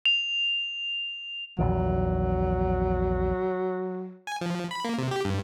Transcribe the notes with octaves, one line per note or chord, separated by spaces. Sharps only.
F7
A#1 E2 D#3 F#3
G#5
F3
B5
A#3
C3
G4
G2